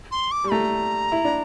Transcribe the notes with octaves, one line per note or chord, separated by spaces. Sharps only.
C6
D6
G3
A3 A#5
E4
D4